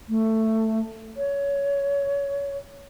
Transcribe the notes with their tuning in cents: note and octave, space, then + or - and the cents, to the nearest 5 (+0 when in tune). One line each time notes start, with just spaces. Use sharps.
A3 +10
C#5 +20